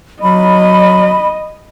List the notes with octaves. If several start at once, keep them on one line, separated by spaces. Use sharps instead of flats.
F#3 D#5 B5